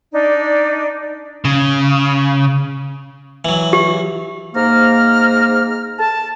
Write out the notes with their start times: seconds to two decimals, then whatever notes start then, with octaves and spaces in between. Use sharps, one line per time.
0.13 D4 D#4 D5
1.45 C#3
3.45 E3 F#3
3.73 G4
4.55 G#2 A#3 C5 A#5 F6
5.99 A5